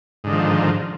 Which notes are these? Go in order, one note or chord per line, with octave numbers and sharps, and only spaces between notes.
G#2 D3 D#3 F3